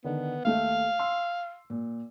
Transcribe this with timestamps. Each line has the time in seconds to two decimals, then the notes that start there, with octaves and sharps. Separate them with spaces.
0.04 D3 D#3 B3
0.44 D#2 A3 E5 F5
0.99 C6 E6
1.70 A#2